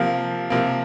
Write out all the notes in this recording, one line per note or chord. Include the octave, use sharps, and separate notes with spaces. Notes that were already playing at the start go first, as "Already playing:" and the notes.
Already playing: C3 F3 A#3 F4 F5
C3 F3 A#3